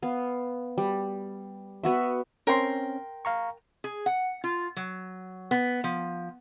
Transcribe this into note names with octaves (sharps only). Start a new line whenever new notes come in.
B3 F5
G3
B3 F#4 E5
C4 C#4 A#4 G5 C6
F5 A#5 C#6
G#4
F#5
F4
F#3
B3
F3